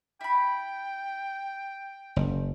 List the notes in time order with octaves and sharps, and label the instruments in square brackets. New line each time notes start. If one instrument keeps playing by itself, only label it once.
[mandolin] E4 B5 [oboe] G5
[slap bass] F#1